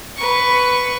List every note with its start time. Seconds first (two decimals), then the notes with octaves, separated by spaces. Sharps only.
0.17 B4 C#6